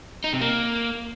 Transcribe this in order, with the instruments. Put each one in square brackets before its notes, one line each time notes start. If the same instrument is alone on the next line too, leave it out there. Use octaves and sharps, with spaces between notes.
[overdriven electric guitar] D#4
C3
A#3